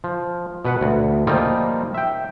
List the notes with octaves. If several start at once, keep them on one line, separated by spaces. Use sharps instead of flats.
F3
B2 B4 F#5
D2
F3 G3 A#3 D#4 F4
E5 G5